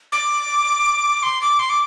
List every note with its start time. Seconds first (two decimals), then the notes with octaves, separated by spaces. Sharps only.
0.12 D6
1.23 C6
1.41 D6
1.59 C6
1.70 D6